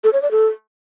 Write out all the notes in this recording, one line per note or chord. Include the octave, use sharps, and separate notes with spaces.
A4
C#5
D5
A4